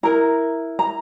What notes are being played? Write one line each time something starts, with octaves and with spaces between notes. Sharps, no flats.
E4 A#4 A#5
A#5